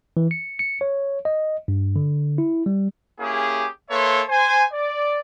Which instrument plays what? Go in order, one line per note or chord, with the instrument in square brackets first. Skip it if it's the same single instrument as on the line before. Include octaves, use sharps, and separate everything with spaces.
[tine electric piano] E3
C#7
C#7
C#5
D#5
G2
D3
E4
G3
[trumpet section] A#3 C#4 E4 G4 G#4
A#3 A4 B4 C#5 E5 C6
C5 G#5
D5